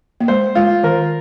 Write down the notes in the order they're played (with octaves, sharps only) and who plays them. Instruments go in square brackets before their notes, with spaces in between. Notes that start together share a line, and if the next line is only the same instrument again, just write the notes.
[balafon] A#3
[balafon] G#3 [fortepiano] C5
[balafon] G#3 [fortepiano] F4
[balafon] D#3 [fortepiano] A#4